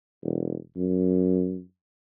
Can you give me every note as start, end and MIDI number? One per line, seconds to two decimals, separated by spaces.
0.23 0.56 28
0.77 1.61 42